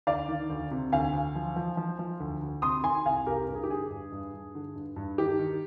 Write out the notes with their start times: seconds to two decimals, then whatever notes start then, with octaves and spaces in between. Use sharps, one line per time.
0.07 D2 D5 F5
0.28 D#3
0.49 D2
0.71 C3
0.92 D2 F5 G#5
1.13 D2
1.35 F3
1.56 F3
1.77 F3
1.99 F3
2.20 D2
2.42 D2
2.62 C3 C6 D#6
2.83 D#3 G#5 C6
3.06 C2 F5 G#5
3.27 C2 G4 A#4
3.48 G2 A#4
3.55 G#4
3.64 G4
3.69 D3 G#4
3.90 G2
4.12 G2
4.33 G2
4.55 D3
4.75 G2
4.96 G2
5.18 D#3 G4
5.39 D#3